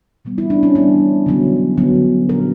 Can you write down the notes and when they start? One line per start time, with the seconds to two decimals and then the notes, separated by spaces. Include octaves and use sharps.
0.25 E3 G3 B3
0.38 E4
0.50 D4
0.63 C#4
0.75 E3 G3 B3 D4
1.26 D3 F#3 B3
1.78 D3 F#3 B3
2.29 A#2 A#3 C#4 A#4